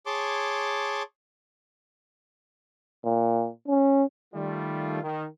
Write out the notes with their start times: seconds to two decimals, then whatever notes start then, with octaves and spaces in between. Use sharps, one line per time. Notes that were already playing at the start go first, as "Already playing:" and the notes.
0.06 G#4 C#5 A5 C6 D6
3.05 A#2
3.67 C#4
4.34 D#3 G3 A3 F4
5.03 D#3